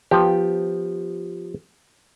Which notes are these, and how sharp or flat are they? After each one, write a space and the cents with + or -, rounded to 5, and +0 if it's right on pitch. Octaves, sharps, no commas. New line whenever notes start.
F3 +5 B3 +0 G4 +0